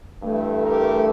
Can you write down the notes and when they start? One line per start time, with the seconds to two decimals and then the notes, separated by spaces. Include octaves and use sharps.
0.22 G2 E3 A3
0.64 G4 A#4